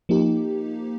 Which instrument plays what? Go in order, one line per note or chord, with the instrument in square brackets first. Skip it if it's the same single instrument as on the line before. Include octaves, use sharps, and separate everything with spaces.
[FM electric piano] F3 A#3 D#4 G4